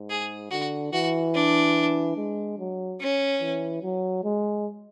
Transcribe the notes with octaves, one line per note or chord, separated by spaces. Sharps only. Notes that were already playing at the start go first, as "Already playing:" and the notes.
Already playing: G#2
G#4
D3 F#4
E3 F#4
D4
G#3
F#3
C#4
E3
F#3
G#3